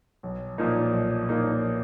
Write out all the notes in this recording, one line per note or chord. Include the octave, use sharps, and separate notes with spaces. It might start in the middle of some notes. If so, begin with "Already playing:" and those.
B1
A#2 F3 A#3 D#4
B1
A#2 F3 A#3 D#4